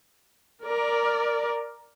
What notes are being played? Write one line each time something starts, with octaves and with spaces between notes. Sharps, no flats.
A#4 D5